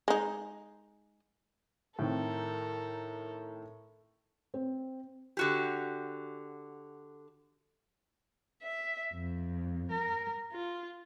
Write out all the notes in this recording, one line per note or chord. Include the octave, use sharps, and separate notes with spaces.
G#3 D#4
A2 D#3 C4 A4 A#4
C4
D3 F#4 G4
E5
F2
A#4
F4